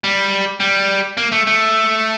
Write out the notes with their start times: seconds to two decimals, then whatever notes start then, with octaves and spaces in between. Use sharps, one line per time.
0.04 G3
0.60 G3
1.17 A#3
1.32 A3
1.47 A3